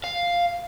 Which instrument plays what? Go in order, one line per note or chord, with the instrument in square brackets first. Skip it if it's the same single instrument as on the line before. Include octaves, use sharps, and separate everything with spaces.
[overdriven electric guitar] F5